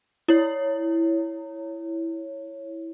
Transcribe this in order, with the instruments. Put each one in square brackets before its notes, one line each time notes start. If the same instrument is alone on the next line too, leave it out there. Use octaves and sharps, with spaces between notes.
[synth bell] E4 C#5